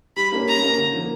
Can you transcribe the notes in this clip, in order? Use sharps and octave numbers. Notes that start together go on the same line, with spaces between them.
G3 B5
A#3 C#4
G3 A#5
A#3 C#4
D3
F3 A#3